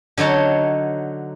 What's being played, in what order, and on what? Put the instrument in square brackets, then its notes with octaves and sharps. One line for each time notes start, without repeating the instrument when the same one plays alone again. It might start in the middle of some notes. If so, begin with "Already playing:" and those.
[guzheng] D3 F#3 D#4 C#5 A5